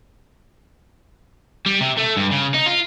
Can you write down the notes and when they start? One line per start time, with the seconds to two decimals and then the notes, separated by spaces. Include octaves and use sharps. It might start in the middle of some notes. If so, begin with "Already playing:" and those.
1.66 G3
1.80 C3
1.97 A3
2.17 G2
2.31 C#3
2.54 D#4
2.66 F4